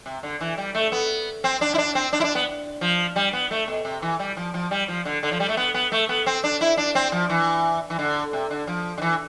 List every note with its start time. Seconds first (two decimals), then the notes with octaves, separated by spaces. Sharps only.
0.06 C3
0.23 D3
0.41 E3
0.58 G3
0.75 A3
0.92 B3
1.44 C4
1.61 D4
1.74 E4
1.78 D4
1.95 C4
2.13 D4
2.20 E4
2.24 D4
2.35 B3
2.81 F3
3.16 G3
3.33 B3
3.51 A3
3.68 B2
3.85 C3
4.02 E3
4.19 G3
4.37 F3
4.54 F3
4.71 G3
4.88 F3
5.05 D3
5.23 D3
5.32 F3
5.40 G3
5.49 A3
5.57 B3
5.74 B3
5.92 A3
6.09 B3
6.26 C4
6.44 D4
6.61 E4
6.77 D4
6.95 C4
7.12 F3
7.30 E3
7.90 E3
7.99 D3
8.33 C3
8.51 D3
8.67 F3
8.98 D3
9.02 E3